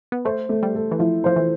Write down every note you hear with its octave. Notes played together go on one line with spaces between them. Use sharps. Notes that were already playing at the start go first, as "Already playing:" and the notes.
B3
A3 C5
A3
G3
A4
E3
F3 E4
F3 C5
E3